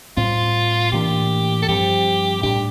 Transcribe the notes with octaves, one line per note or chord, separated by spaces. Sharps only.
A2 G3 C4 F4
A2 E3 A#3 D4 G4
A4
G2 F3 C4 G4
A2 G3 D4 G4